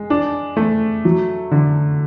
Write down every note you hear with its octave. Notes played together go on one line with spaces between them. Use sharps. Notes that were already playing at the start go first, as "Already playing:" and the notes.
Already playing: G#3
D4
A3
F#3
D3